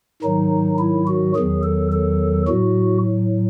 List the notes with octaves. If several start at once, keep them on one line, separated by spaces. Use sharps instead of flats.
G#2 D#3 F#3 D#4
E4
F#4
E2 D#3 F#3 G#4
A4
A4
A2 F#3 F#4